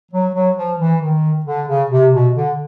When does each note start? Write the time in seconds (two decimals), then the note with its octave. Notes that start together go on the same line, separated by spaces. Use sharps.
0.11 F#3
0.33 F#3
0.56 F3
0.78 E3
1.01 D#3
1.45 D3
1.68 C#3
1.90 C3
2.12 B2
2.35 D3